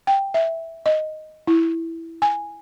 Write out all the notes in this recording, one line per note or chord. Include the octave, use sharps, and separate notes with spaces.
G5
E5
D#5
E4
G#5